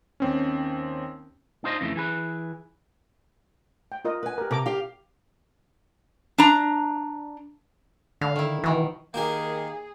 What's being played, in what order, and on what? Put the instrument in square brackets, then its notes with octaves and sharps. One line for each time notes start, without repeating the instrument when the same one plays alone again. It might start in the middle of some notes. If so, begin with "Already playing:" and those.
[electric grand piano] D#2 C4 C#4
[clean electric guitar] D4 D#4 F4 C5 D5 D#5
F2 C#3 E3 A3
E3 G#4 B4
[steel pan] G5
F4 A#4 D#5
[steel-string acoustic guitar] B4 G#5
[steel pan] G4 A#4
[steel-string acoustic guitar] C3 [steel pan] A4 A#5 D6
[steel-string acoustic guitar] G4 F5
[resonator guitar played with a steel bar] D4 A#5
[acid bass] D3 [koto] F5
[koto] D#3 E4
[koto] B2 D#3 [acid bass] E3
[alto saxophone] D#3 [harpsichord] A#3 G4 A#4 [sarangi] G#4